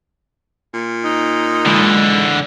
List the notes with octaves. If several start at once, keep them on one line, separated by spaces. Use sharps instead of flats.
A#2
D#4
D3 E3 G#3